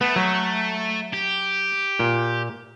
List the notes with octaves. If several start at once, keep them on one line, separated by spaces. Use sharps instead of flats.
A3 B3
F#3
G4
A#2